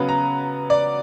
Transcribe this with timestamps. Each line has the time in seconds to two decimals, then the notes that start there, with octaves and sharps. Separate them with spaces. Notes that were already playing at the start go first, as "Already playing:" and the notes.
Already playing: C#3 F#3 B3 B5
0.08 A#5
0.70 D5